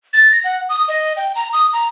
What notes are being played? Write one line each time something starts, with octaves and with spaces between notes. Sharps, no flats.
A6
A#6
F#5
D#6
D#5
G5
A#5
D#6
A#5